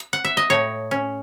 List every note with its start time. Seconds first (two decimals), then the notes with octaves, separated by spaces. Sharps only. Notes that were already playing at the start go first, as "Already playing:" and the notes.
Already playing: G#5
0.13 F#5
0.25 E5
0.37 D#5
0.50 A2 C#5
0.91 C#4